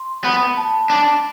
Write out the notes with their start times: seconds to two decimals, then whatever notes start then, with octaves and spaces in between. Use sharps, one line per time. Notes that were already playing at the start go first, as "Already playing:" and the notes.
Already playing: C6
0.24 B3 B5
0.57 A5
0.90 D4